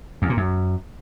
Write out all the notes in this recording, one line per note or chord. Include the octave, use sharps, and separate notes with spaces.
E2
A#2
F#2